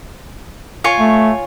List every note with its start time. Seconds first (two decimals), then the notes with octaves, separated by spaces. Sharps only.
0.84 F4 C#5 G#5
1.00 A3